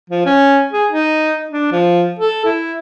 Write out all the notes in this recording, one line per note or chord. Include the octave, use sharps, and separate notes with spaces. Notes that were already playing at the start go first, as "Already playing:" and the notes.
F3
C#4
G#4
D#4
D4
F3
A4
E4